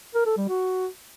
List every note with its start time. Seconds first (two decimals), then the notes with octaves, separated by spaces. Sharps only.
0.15 A#4
0.26 A4
0.37 G3
0.49 F#4